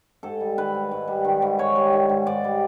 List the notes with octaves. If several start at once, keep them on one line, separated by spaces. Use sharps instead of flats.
G#2 A4
G3
D#3 B4
G#2
G#2
G3
D#3
G#2
G#2 C#5
G3
D#3
G#2
G#2 D5
G3